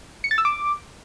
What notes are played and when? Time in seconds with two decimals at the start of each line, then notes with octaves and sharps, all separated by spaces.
0.24 C#7
0.31 A6
0.38 E6
0.45 D6